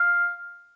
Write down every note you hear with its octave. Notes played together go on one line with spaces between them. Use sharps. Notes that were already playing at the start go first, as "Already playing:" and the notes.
Already playing: F5